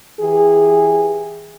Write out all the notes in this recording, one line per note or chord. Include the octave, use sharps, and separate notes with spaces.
E3 G4 G#4